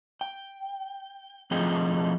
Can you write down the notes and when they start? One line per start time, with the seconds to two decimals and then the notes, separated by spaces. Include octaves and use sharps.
0.21 G5
1.51 F3 A3 C4 D#4 G#4 G5